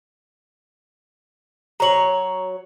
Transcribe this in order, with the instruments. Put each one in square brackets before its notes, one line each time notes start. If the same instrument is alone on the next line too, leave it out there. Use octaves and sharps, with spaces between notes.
[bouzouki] F#3 C#5 [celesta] A#5 F#7